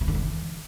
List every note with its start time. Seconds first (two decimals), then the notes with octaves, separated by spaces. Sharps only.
0.01 C3
0.08 D3
0.15 E3